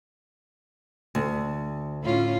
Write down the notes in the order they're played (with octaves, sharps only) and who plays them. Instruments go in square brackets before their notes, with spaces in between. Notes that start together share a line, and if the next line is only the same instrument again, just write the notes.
[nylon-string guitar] D2
[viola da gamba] A2 C#4 F4